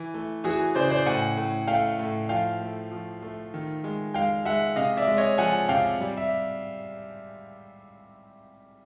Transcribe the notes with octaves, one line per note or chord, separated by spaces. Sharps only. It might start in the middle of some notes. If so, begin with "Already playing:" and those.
Already playing: E3
A3
E3 F#4 G#4
C#3 C5 D5
C5 D5
A2 F#5 G#5
A2
A3 F5 G5
A2
F3 F5 G5
A3
F3
A3
D#3
G#3
G#3 F5 G5
G#3 E5 F#5
C3 D#5 F5
D5 E5
G#3
C#5 D#5
F3 F#5 G#5
C3 F5 G5
G3
E5